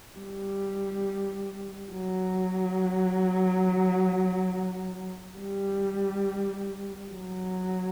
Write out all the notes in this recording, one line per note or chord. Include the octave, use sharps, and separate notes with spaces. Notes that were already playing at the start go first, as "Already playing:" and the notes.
G3
F#3
G3
F#3